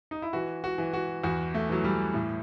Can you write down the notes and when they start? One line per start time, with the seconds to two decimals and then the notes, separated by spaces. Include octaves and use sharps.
0.11 D#4
0.22 E4
0.33 E3 F#4
0.64 F#4
0.78 E3
0.93 F#4
1.24 E2 F#4
1.54 A3
1.69 E3 F#3
1.84 G3
2.14 A2